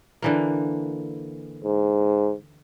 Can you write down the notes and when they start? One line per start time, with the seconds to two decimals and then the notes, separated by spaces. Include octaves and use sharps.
0.22 D3 E3 A#3
1.64 G#2